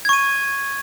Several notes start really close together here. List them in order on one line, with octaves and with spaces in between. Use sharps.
G#6 C#6 D#7